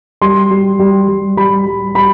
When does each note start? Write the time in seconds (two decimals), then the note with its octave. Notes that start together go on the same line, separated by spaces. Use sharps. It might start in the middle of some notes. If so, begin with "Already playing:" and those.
0.21 G3 C6
0.51 G3
0.79 G3
1.08 G3
1.37 G3 B5
1.66 G3
1.95 G3 B5